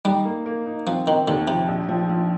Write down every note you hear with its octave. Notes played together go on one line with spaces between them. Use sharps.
G3 D#4
A#3
A#3
D#4
F3 C4
D#3 C4
D#2 D3
C3 F3
A#1
F3
F3